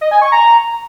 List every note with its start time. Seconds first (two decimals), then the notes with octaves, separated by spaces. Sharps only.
0.01 D#5
0.11 G#5
0.22 C#6
0.32 A#5